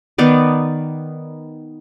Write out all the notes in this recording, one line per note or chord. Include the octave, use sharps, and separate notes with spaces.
D#3 B3 D#4 D5